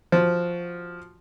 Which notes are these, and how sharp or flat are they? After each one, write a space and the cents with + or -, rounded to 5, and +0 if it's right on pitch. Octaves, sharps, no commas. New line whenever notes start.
F3 +0 F#4 +5